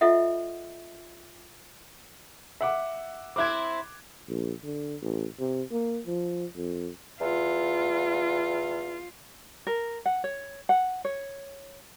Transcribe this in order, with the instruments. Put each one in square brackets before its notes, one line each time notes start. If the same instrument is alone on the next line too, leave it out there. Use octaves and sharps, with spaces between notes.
[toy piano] F4 A4 D#5 E5 F#5
[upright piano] E5 F#5 D6
[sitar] C4 E4 [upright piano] D6 F#6 G#6
[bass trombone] A#1
D3
A1
C3
A#3
F3
F2
[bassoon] E2 [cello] F4
[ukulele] A#4
F#5
C#5
F#5
C#5